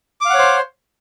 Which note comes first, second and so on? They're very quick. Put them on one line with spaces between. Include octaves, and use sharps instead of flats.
D6 F5 F#5 C#5 C5